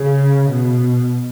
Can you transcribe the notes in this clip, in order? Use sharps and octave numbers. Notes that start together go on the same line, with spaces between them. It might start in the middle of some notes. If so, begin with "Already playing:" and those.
Already playing: C#3
B2